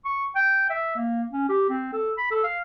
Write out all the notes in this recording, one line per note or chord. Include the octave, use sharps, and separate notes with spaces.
C#6
G5
E5
A#3
C#4
G4
C4
A4
B5
A4
F5